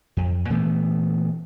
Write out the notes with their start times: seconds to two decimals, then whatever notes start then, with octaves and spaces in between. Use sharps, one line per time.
0.17 F2
0.50 A#2 E3 A3 B3